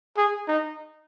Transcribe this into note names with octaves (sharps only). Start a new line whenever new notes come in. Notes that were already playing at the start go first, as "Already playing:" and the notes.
G#4
D#4